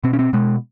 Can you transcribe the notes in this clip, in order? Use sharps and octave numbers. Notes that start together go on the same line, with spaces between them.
B2 C4
C#4
C4
B2 G#3